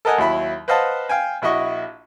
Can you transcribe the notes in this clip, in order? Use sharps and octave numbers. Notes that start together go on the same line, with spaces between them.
A4 A#4 D#5 F#5 G#5
D#2 F#3 E4 B5
B4 C5 D#5 F5 F#5 A5
F5 G5 G#5
A#1 E4 F#4 D#5 C#6